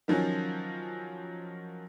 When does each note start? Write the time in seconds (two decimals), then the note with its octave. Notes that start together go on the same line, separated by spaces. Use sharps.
0.08 D#3 F3 F#3 C#4